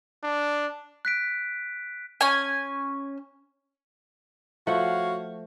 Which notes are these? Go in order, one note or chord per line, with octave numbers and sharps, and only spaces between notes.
D4
F#6 B6 D7
C#4 G#5
F3 A3 F#4 C#5 F5 F#5